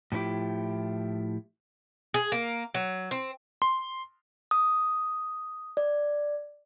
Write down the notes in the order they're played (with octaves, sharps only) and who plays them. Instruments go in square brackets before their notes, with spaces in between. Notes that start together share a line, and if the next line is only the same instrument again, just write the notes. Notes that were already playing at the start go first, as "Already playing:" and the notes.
[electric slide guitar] A2 F3 C4 E4 G4
[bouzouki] G#4
A#3
F#3
C4
[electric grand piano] C6
[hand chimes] D#6
D5